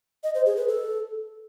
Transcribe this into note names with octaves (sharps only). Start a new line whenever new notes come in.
D#5
C5
G#4
B4
A4